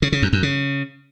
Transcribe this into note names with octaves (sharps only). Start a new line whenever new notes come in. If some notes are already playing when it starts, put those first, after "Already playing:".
C#3
C#3
F#2
F#2
C#3